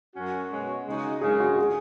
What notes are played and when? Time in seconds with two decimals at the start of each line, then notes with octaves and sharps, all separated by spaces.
0.14 F#2 F#3 C#4 F#4
0.50 B2 G#3 C#4 F#4
0.86 C#3 G#3 D#4 F#4
1.21 F#2 C#3 G#3 G#4
1.40 F#4
1.58 G#4